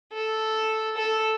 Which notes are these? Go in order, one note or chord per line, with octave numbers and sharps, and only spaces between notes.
A4
A4